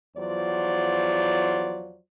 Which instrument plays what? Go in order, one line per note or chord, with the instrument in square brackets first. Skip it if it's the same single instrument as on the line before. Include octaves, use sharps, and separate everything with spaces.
[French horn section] E2 F3 F#3 F4 C5 D5